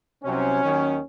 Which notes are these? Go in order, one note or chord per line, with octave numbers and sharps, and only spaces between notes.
C2 C3 F#3 C4 C#4
D#2 D#3 F#3